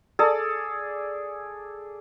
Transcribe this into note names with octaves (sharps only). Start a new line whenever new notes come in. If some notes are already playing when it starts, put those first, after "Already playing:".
G#4 A4 D5